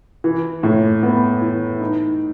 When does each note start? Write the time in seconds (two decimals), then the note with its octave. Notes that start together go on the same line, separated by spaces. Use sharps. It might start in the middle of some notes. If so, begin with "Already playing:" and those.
0.24 E3
0.63 A2
1.03 B3
1.42 E3
1.81 D#4